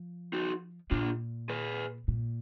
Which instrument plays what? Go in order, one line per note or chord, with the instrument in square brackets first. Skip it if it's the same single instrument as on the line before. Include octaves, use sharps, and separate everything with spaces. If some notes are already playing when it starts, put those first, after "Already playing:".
Already playing: [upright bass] F3
[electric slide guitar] D#4 F#4
[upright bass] A#2 [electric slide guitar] D4 F4
[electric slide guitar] G#4 B4
[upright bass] A#2